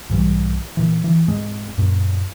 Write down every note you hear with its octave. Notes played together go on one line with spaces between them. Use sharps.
B1 G#2 E3 G3
A#2 E3
E3
E1 G#2 G#3 C4
F#2 A#2